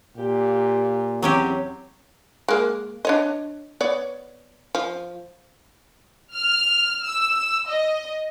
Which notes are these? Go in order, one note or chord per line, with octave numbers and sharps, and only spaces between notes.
A#2 G4
E2 F#3 C4 C#4 G4
G#3 A#3
D4 C#5 D#5
B3 C#5 D5
F3
F6
E6
D#5